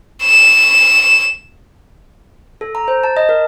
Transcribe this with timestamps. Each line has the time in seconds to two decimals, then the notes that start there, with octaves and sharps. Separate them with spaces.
0.24 E7
2.61 A4
2.75 A#5
2.88 C5
3.03 A5
3.17 D#5
3.29 A#4